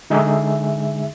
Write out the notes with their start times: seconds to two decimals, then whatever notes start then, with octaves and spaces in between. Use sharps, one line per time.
0.10 D3 G#3 D#4 G#4 E5